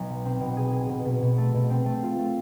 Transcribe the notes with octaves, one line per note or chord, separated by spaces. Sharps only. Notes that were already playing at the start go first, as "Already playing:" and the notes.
Already playing: B1
B2
C4
B2
G#4
G#4
B2
B2
B2
A3
B2
C4
A3
F4
A3